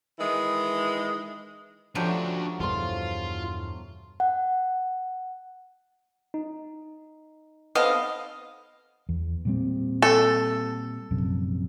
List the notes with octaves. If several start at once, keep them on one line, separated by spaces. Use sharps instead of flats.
D#3 E3 G#3
F3 F#3 A3 C#4 D4 F#4 G4
E2 G2 B2 F4 C5 A5 C6
F#5
D#4
B3 C4 A4 D#5 F5 F6
E2
A#2 G3 C4
A4
A#1 F#2 C3